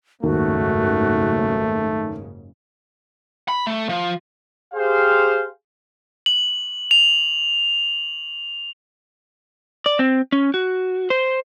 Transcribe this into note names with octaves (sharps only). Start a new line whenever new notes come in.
F#1 D#2 G#2 C#3 A3 F#4
B5
A3
F3
G4 G#4 C5 F5
F#7
F7
D5
C4
C#4
F#4
C5